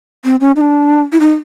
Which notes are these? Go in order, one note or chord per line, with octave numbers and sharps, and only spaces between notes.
C4
C#4
D#4
D4
E4
D#4